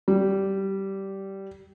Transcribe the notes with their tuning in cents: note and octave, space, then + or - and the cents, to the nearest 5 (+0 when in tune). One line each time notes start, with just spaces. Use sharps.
G3 -15